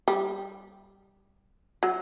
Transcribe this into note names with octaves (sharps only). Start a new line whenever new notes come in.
G3
F#3